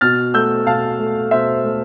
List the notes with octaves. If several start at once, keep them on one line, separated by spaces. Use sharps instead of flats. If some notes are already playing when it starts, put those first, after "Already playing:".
B2 F6 A6
A3 E6 G6
B2 F5 A5
A3
B2 C5 E5
A3